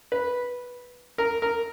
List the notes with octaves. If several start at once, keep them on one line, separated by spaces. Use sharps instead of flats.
B4
A#4
A#4